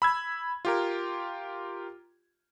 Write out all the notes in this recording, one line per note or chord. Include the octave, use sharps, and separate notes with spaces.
B5 E6 G#6
F4 G4 A#4